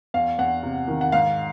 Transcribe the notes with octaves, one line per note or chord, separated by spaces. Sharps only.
E2 F5
E2 F#5
C3
D#3
F#5
G#2 F5